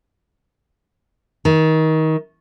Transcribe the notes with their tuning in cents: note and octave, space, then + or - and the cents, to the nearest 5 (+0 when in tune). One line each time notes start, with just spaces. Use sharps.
D#3 +25